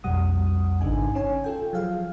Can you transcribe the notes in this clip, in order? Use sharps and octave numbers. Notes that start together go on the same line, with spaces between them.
B1 F2 G3 F#5 D#6
G#1 C#3 D4 D#4 G#5
C#4 C#5 G#5
F4 A4 G5
F3 F#3 G#4 F5